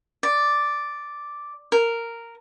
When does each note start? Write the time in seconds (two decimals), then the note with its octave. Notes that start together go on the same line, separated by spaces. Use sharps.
0.23 D5
1.72 A#4